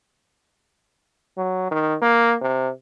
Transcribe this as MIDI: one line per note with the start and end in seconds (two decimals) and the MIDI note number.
1.37 1.68 54
1.71 1.96 51
2.02 2.35 58
2.41 2.69 48